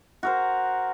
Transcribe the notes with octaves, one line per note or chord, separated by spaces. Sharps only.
F#4 A#4 C5